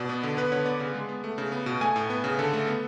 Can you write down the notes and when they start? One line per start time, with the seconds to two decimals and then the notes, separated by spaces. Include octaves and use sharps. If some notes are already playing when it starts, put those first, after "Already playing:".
Already playing: B2 D5
0.09 B3
0.23 D3
0.37 B3 B4
0.52 D3 C#5
0.66 B3 D5
0.80 C#3
0.94 G#3
1.09 B3
1.24 A3
1.38 C#3
1.52 B3
1.66 B2
1.81 A3 G#5
1.96 A2
2.10 B3
2.24 C#3
2.39 D3 A4
2.53 A3
2.67 B3